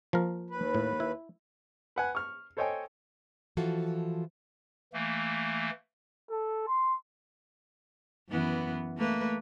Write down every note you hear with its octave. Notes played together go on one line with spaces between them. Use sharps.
F3 A#3 A#4
D#2 B4
A2
E4
B4 F#5 G#5
C#6 F6
A4 C5 C#5 D#5 G5 G#5
E3 F3 F4 F#4 A4
E3 A3 A#3
A4
C6
F#2 E3 B3
A3 A#3 B4